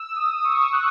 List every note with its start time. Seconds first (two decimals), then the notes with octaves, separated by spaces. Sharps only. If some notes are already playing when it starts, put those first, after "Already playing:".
Already playing: E6
0.16 D#6
0.45 C#6
0.73 F#6